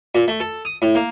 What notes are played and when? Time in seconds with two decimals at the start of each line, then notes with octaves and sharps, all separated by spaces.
0.15 A#2
0.28 A3
0.40 A4
0.65 D#6
0.82 A2
0.95 A#3